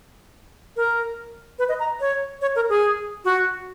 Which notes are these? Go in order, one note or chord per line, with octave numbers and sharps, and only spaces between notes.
A#4
B4
D#5
A#5
C#5
C#5
A#4
G#4
F#4